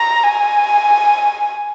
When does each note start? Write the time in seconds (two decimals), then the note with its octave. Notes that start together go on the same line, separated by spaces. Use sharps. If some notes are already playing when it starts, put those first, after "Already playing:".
Already playing: A#5
0.24 G#5